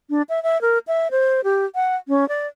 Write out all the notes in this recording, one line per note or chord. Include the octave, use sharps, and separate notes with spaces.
D4
E5
E5
A#4
E5
C5
G4
F#5
C#4
D5